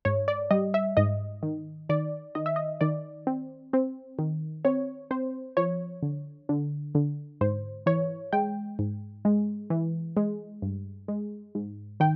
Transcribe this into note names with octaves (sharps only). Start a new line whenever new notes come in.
G#2 C#5
D5
G3 D#5
E5
G#2 D#5
D#3
D#3 D5
D#3 D#5
E5
D#5
D#3 D5
C4
C4
D#3
C4 C#5
C4 C5
F3 C#5
D3
D3
D3
G#2 C5
E3 C#5
G#3 G5
G#2
G#3
E3
G#3
G2
G#3
G#2
D#3 G5